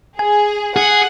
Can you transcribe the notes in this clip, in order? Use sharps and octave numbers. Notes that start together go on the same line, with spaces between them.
G#4 G#5
G#4 F#5